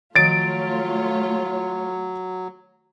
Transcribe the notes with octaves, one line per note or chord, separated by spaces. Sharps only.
D#3 F3 F#3 A3 F4 C#5 A6 D7